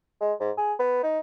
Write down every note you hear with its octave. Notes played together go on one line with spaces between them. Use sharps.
G#3
G#2
G#4
B3
D#4